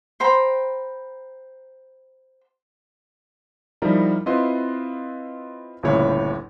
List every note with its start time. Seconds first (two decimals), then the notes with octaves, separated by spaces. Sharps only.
0.20 C5 G5 A#5 B5
3.82 F3 G3 D#4 E4 A#4 A#5
4.26 C4 E4 F4 B4 D#5 C6
5.83 G1 D2 A#2 C#3 E4 C#5